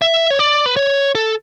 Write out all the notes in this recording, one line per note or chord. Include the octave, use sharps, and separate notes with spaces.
E5
C#5
D5
B4
C#5
A4